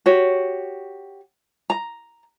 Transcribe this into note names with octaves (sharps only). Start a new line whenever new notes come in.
F#4 G4 C#5
A#5